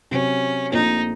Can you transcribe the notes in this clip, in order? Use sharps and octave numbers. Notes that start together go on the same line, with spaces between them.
C3 F#3 C4 C#4
A#1 A#2 A3 C4 D#4 F4